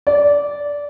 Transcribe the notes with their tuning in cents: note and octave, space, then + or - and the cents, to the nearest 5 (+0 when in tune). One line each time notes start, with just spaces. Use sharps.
D5 -15